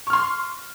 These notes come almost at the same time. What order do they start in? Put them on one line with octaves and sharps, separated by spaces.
C#6 F6 C6